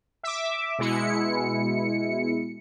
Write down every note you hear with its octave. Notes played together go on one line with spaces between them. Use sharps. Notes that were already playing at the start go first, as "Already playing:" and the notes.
E5 D6
B2 G#3 E4 C#7